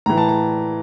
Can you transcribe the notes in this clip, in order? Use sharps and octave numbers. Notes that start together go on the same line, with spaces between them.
A2 E3 A#5
A5
A#5